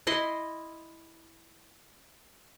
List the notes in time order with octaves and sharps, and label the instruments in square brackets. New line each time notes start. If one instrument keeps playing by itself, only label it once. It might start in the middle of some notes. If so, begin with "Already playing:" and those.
[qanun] E4 D#5 C6